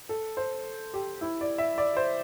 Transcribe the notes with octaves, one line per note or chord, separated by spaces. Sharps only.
A4
C5
G4
E4
D5
E5
D5
C5